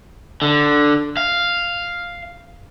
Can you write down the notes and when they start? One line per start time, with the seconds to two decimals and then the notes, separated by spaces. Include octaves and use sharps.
0.42 D3
1.17 F5